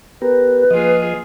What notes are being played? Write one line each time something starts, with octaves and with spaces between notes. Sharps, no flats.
B3 G4 A#4 B4
F3 A#3 F4 G#4 D#5